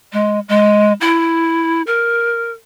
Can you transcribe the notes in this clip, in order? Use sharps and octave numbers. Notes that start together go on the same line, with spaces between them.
G#3
G#3
E4
A#4